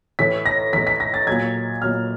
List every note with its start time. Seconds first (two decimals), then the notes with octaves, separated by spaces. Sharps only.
0.19 A2 E3 B6
0.46 A#6
0.73 E3 B6
0.76 A2
0.87 B6
1.00 A#6
1.14 A6
1.27 A#2 F#3 G#6
1.82 A#2 F#3 F6